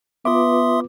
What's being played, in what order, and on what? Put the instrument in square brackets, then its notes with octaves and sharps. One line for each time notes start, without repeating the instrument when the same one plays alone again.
[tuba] B3 [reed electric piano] F4 B4 D6 [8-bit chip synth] E5 C6 D#6